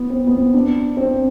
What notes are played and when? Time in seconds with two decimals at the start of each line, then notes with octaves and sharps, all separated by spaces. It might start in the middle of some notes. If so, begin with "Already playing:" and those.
Already playing: B3
0.10 C4
0.27 B3
0.32 C4
0.54 D4
0.97 C4